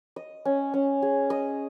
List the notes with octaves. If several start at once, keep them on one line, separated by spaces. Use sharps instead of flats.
D#5
C#4
C#4
G#4
D#5